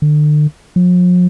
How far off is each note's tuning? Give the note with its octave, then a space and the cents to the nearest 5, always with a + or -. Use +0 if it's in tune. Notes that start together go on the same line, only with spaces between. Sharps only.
D3 +35
F3 +45